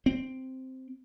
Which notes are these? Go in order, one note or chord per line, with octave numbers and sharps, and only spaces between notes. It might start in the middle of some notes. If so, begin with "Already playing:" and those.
C4